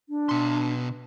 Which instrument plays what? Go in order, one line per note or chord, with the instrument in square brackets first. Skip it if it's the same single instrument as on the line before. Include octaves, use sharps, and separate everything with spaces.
[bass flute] D4
[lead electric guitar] B2 C6